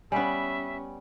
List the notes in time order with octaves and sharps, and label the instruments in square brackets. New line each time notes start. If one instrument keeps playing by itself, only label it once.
[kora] G3 B3 [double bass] C#4 [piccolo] E5 [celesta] G#5